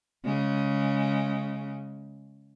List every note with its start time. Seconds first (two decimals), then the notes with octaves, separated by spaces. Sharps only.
0.25 C#3 G#3